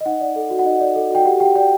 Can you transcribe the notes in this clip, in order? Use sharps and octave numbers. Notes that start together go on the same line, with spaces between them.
D#5
D#4 F#5
D5
A4
F#4
F#5
D#4 D#5
D5
A4
F#4 G5
G4 F#5
G4 G5
D5 G5